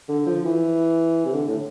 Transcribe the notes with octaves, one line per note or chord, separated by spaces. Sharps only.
D3
F3
E3
C3
D3
A2